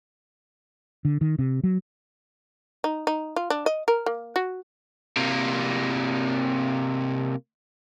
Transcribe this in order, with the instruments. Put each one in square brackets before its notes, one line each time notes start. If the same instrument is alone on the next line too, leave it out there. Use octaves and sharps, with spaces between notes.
[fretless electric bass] D3
D#3
C3
F#3
[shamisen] D#4
D#4
F4
D4
D#5
A#4
A#3
F#4
[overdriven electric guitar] C3 A#3